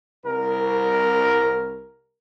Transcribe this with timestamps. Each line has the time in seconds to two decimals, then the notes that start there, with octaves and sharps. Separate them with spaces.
0.24 C2 A#4